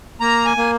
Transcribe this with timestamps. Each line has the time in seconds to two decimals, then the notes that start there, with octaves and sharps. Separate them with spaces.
0.21 A#3 A#5
0.45 G#5
0.57 A#3